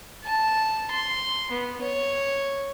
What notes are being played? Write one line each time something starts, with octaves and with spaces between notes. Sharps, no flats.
A5
C6
B3
C#5